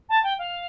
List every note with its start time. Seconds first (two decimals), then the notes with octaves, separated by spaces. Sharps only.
0.09 A5
0.23 G5
0.38 F5